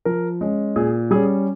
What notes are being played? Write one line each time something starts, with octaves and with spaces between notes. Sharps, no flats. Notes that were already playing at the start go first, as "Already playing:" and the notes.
F3 A#4
G#3 C#4
A#2 G#4
G3 C#4 G#4